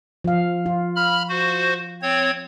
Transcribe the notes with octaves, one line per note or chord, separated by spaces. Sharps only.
F3 F5
F4
B5 F6
F#4 C5
C4 C#5 G#6